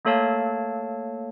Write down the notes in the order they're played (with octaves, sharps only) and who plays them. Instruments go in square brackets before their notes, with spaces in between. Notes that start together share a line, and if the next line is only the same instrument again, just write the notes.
[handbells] A3 A#3 A4 C#5 F5 A5